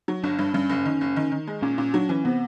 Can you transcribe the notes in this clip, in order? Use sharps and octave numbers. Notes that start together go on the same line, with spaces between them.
F#3
G1 D4
G2 D4
G2 C#4
F#1
D#3
F#1
D#3
D#3
G#3
A#2 C#4
A#2 C#4
F#3 D4
E3 C#4
C3 B3